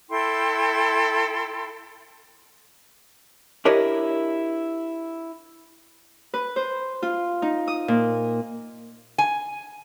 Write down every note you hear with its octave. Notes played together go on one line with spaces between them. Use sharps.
E4 A4 G5 C6
D4 E4 G4 A#4 C#5 D#5
B4
C5
F4
D#4
D#6
A#2
G#5